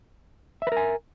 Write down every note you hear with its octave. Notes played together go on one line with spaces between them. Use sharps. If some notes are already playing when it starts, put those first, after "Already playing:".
A#4 B4 E5 G#5